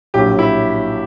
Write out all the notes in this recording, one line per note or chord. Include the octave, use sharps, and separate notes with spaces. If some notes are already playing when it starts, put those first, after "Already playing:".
A#1 A2 F#3 G4
E4